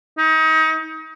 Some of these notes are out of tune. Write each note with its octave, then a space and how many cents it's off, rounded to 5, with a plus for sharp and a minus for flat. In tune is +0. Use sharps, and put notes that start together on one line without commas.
D#4 +30